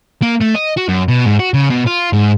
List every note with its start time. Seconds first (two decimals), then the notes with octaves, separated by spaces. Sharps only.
0.22 A#3
0.41 A3
0.56 D#5
0.77 F#4
0.89 F#2
1.08 B2
1.25 G#2
1.39 F#4
1.54 C#3
1.70 B2
1.87 F4
2.13 G#2